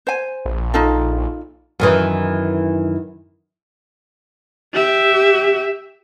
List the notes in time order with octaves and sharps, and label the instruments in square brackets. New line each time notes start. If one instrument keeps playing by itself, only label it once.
[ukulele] C5 G#5
[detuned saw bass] A#1
[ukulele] D#4 F4 A4
[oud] F#2 D#3 E3
[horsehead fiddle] G4 E5